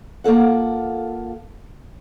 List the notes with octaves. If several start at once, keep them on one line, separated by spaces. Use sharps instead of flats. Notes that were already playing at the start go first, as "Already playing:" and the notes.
A#3 F4 A4 F#5